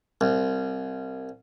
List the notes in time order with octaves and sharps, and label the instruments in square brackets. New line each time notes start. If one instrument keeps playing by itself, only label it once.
[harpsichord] C2